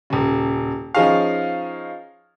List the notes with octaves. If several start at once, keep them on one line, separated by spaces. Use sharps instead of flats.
D#1 C#3
F3 C#4 D#4 G#4 F5